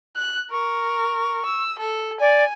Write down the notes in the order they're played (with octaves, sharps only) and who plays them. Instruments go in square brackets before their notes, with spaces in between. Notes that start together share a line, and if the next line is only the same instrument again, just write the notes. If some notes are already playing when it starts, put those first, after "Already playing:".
[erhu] F#6
[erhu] A#4 [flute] C#6
[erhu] E6
A4
[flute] D5 [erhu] G#5